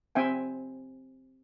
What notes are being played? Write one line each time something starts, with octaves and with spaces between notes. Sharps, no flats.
C4 E5 G5 G#5